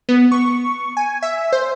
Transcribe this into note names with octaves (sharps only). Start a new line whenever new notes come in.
B3
C#6
G#5
E5
C5